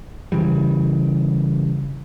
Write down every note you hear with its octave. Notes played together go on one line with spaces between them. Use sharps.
C#3 E3 G3